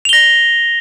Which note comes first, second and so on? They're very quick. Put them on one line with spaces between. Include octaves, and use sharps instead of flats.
F7 G7 A#6